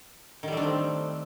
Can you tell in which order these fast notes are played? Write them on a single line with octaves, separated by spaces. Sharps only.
D#3 G3 A3 D4 C4